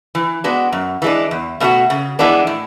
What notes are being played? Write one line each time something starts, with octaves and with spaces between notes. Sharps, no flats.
E3
G#3 B3 D4 F#4
F#2
E3 G#3 D4
E2
B2 A3 D4 F#4
C#3
E3 G#3 B3 D4
A2